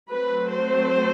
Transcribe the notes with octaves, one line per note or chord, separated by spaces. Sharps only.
F#3 A3 C4 B4
C5